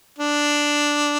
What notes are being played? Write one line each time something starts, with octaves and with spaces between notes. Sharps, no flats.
D4